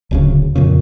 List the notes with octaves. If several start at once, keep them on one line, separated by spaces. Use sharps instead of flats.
D1 D2 C#3
F2 A#2 C#3